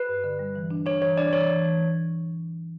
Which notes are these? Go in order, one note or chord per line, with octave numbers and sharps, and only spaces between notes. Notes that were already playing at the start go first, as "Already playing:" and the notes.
Already playing: B4
G2
D3
G3
E3
D4
D4 C#5
E3 C#5
D4 D5
E3 C#5
E3
E3